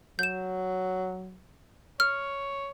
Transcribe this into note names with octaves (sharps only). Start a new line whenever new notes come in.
F#3 G6 E7
C#5 F6